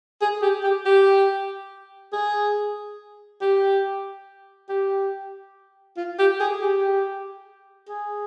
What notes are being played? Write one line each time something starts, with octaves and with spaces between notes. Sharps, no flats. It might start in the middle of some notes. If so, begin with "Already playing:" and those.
G#4
G4
G4
G4
G#4
G4
G4
F4
G4
G#4
G4
G#4